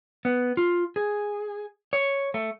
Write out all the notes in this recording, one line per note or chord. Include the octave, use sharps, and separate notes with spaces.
B3
F4
G#4
C#5
A3